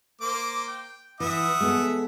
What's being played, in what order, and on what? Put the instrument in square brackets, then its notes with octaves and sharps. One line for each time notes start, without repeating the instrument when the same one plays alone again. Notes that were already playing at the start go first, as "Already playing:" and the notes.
[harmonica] A#3 C5 D6
G5
[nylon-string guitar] E3 [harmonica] E5 F#5 D#6
[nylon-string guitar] G#3 B3 A4